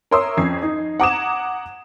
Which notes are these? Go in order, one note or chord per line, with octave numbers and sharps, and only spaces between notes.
A#4 C#5 E5 C6 D#6 E6
F2 C#4 G#6 C7
D#4
F#5 A#5 D6 D#6 G#6 E7